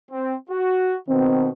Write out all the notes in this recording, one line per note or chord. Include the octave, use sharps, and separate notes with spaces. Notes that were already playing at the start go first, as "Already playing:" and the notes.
C4
F#4
B2 D#3 C4